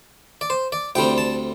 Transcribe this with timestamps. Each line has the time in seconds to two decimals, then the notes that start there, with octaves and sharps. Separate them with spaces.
0.41 D5
0.50 C5
0.72 D5
0.95 D2 D3 G3 C4 G5
1.18 A5